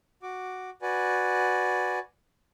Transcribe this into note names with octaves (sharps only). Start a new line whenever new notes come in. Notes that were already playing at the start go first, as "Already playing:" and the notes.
F#4 D6
F#4 B4 D5 G#5